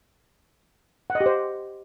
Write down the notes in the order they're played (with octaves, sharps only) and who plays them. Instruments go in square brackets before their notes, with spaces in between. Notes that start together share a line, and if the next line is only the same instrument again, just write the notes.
[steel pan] F#5
D#5
G4
C5